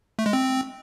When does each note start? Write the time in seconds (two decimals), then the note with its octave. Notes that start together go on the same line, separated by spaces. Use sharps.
0.19 A3
0.26 G#3
0.33 C4